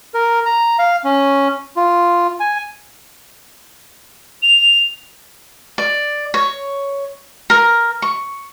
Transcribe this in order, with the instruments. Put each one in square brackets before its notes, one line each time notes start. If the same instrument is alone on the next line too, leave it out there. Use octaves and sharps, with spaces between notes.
[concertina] A#4
A#5
F5
C#4
F4
G#5
[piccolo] F7
[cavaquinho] D5
C#5
A#4
C#6